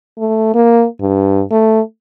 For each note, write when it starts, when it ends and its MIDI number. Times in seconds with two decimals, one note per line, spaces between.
0.18 0.53 57
0.54 0.85 58
1.01 1.42 43
1.51 1.80 57